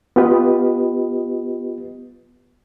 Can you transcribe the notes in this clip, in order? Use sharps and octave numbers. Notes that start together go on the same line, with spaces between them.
B3 F4 G4 B4 D#5